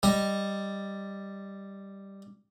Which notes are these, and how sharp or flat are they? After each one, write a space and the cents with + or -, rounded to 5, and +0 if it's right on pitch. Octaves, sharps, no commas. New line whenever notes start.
G3 +0 D#5 -5